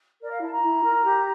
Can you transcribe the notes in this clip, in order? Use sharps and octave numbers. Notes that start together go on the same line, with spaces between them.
A#4 D5
F5
E4 A5
A#5
E4
A#4
G4